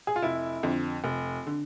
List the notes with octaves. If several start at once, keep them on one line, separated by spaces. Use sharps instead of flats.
G#4
F4
F1 E4
F2 D3
F1
D3